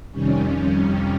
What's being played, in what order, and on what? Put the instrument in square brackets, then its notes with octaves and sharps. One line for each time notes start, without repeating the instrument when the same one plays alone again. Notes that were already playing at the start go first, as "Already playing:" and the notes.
[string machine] F2 C3 D#3 G3 C#4